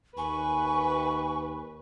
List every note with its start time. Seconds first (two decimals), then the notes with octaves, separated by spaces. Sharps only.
0.17 D#2 B4 G#5 C#6